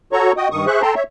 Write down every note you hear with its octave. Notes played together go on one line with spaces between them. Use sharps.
F#4 A4 C#5 A#5 C#6
F#4 D#5 G5 D#6
G2 D#3 C#6 D#6
G#4 C5 E5 C#6 F#6
A4 G5 A5 A#5 C6
C#5 E5